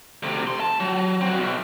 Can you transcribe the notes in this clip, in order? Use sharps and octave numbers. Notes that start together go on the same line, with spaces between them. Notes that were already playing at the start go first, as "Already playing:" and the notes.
D2 C3
C#2 C6
A5
F#3
C4 F#4
B1